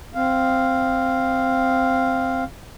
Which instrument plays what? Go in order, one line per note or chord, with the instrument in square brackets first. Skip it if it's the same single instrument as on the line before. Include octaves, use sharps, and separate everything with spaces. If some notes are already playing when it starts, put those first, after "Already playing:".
[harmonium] C4 F5